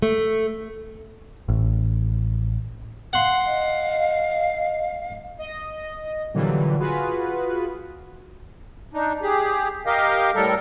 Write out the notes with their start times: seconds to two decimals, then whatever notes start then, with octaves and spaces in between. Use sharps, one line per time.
0.02 A3
1.48 A1
3.13 F5 F#5 C6
3.46 D#5
5.39 D#5
6.34 A#2 D3 E3 F#3 G3
6.78 F4 F#4 G#4 B4
8.94 D4 D#4
9.22 G4 G#4
9.86 G4 A#4 D#5 F5
10.35 A2 G3 A4 A#4